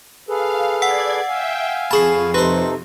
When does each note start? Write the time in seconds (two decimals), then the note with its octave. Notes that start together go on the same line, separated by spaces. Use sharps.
0.29 G#4 A4 B4 F5
0.82 D5 F#5 E6 G#6 C7
1.29 E5 F5 G5 G#5
1.91 F2 G#4 A5 B5 C#6 C7
2.34 C3 D#4 G4 A4 B4 C5